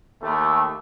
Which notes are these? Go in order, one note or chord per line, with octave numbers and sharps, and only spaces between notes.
D#2 A3